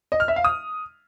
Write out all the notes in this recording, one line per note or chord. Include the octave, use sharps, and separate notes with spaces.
D#5
F6
E5
F5
D#6